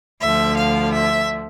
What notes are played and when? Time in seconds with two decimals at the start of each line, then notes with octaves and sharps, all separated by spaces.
0.21 D2 D3 F3 E5
0.57 F5
0.92 E5